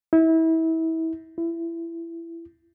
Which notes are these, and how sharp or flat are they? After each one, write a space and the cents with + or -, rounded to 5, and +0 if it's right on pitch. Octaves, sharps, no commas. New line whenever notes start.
E4 -30
E4 +20